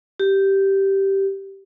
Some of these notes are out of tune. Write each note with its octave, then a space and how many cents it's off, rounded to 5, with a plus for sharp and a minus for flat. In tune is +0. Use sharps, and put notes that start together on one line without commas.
G4 -10